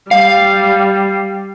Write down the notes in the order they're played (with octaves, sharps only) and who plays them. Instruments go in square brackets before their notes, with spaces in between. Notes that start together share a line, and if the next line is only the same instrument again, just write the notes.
[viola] G3 [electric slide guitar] F5